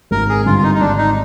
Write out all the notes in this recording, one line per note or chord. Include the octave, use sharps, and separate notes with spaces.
G#1 A#4
G#4
G2 D3 F4
F4
D#4
D#4
G#1 D4
D#4